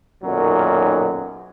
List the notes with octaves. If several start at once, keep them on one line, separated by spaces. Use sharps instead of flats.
B1 F#2 A#2 D#3 F#3